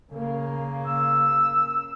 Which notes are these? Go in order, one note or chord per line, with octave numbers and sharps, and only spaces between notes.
C#3 A#3
E6